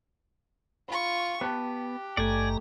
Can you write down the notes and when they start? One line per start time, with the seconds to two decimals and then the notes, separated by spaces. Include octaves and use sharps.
0.89 F4 B5 C#6
1.41 B3 G4 A5 F#6
2.17 G#1 G2 A3 D5 G#5 A#5